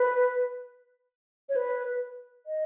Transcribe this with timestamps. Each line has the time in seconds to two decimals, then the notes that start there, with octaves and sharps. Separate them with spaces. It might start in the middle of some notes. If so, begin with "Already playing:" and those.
Already playing: B4
1.49 C#5
1.56 B4
2.46 D#5